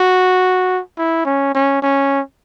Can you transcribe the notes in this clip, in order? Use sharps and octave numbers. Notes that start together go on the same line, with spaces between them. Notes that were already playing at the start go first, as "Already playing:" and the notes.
Already playing: F#4
E4
C#4
C#4
C#4